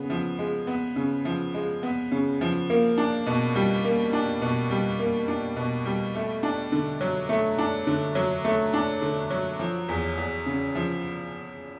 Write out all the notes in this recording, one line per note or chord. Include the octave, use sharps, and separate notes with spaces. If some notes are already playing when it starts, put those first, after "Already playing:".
Already playing: C#3 B3
F3
G#3
B3
C#3
F3
G#3
B3
C#3
F3
A#3
D4
B2
G3
A#3
D4
B2
G3
A#3
D4
B2
G3
A3
D4
D3
F#3
A3
D4
D3
F#3
A3
D4
D3
F#3
F3
E2
E2
C#3
F3